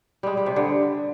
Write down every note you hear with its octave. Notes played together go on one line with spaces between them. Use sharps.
G3 G#3
G3
C3
D3